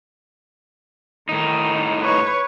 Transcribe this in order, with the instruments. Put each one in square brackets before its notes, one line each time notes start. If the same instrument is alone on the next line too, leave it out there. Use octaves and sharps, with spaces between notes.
[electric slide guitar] A2 D#4 [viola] D#3
[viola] B4 C#5